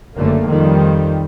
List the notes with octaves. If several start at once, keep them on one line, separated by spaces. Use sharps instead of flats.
F#1 D3 A3 A#3
F2 D#3 G3